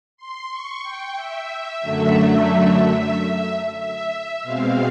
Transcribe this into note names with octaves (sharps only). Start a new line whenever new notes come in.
C6
C#6
G5
E5
F#2 D3 F#3 A3
E5
B2 G#3 C4 F5